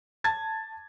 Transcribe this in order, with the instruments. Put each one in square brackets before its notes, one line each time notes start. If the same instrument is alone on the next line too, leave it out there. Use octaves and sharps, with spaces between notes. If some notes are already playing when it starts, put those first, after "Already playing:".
[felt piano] A5 G#6 A6